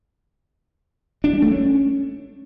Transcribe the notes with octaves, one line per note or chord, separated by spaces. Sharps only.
D4
G3
A3
C#4